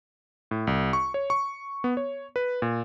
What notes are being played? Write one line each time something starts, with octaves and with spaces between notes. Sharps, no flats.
A2
C2
C#6
C#5
C#6
B3
C#5
B4
A#2